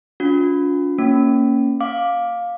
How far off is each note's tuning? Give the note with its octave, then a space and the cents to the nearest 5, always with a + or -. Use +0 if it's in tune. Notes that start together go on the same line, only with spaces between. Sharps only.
D4 -40 F4 +35
A#3 +0 C#4 +0
F5 +15 D6 +0